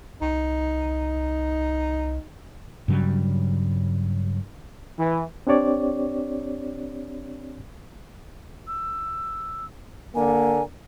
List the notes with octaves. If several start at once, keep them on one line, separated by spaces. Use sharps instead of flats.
C2 D#4
G2 C#3 F#3 G3
E3
C4 D4 G4 C#5 D5
E6
D3 A#3 A#4 G#5